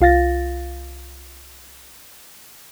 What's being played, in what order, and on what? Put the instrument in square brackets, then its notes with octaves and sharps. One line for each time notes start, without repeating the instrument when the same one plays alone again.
[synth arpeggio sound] C2 F4 F5 A6 A#6